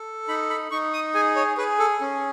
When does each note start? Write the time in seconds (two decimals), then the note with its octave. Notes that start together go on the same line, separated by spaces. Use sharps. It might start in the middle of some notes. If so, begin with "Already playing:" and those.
Already playing: A4
0.28 D#4 B5
0.50 B5
0.71 D#4 C#6
0.93 D#6
1.14 G#4 G#5
1.36 C#5
1.57 G#4 B4
1.79 A4
2.01 C#4